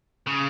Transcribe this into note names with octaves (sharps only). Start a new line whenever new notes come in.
C#3